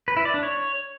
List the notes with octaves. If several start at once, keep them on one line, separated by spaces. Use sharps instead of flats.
B4
E4
D5
D4
C#5